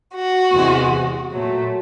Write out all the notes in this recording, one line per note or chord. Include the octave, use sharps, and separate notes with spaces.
F#4
E2 C3 E3 G#3
A#2 F#3 A3